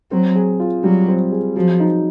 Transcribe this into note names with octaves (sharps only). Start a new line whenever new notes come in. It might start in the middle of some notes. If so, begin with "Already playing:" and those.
F#3 C4
G#4
F4
F#3 G3
C4
G#4
F3 F#3
D#4